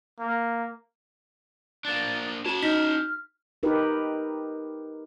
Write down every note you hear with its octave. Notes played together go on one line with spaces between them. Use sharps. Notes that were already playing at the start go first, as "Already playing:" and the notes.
A#3
A#3 D4 A6
C#4 F#4 A5 E7
D#4 F6 B6
D#4 G4 A#4 B4